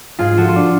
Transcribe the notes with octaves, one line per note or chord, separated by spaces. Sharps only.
G#2 F4 G#4
F3 F#4 A4
F4
D4